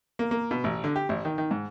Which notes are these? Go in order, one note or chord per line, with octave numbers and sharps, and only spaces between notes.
A#3
A#3
B2
A1
D3
G4
A1
D#3
D#3
G#2